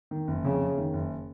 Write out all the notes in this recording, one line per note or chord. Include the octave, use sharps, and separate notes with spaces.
D#3
F#1
F2 C#3
F#1
D#3
F#1